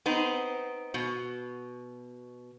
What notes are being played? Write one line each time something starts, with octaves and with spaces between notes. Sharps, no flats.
B3 C4 D#4
B2